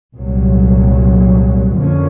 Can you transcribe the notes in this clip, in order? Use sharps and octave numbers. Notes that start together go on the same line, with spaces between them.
C2 A#2 F#3
F2 D3 F3 A#3 C#4